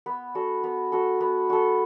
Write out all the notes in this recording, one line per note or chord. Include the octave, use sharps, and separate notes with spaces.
B3
F#4 A4
B3
F#4 A4
B3
F#4 A4